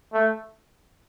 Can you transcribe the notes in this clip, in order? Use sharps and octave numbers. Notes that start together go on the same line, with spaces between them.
A3